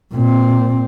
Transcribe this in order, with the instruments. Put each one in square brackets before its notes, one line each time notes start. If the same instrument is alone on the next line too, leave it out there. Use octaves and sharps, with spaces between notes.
[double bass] A#2 C4